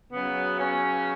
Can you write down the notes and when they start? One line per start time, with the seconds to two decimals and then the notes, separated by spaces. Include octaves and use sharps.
0.12 C#3 F#3 B3
0.59 C#4